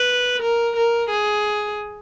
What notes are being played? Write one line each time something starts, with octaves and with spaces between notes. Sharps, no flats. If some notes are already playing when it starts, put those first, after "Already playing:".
Already playing: B4
A#4
A#4
G#4